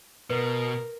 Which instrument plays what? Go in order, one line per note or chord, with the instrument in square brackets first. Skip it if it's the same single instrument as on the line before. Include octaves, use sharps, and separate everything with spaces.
[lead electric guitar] B2 [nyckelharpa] A#4 [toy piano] B4